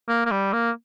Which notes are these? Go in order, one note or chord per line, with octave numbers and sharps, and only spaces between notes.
A#3
A#3
G3
A#3